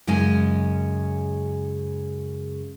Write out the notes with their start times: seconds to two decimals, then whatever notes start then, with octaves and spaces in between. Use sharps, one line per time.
0.07 F#2 C#3 G#3 C#4 D#5 G#5